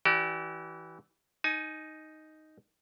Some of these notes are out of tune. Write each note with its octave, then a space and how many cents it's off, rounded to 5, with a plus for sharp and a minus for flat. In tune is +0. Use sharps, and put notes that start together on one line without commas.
E3 -10 G4 -45 D5 +5
D#4 +0 G#5 +25